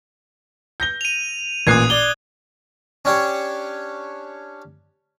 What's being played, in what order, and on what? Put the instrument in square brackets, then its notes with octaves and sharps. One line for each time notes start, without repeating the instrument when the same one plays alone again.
[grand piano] G6 A#6 G7
[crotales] D#7 F7
[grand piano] A1 A#2 C7 [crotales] D#6 F#6 G#6
[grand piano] D5 [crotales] G7
[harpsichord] C#4 D4 G4 C#5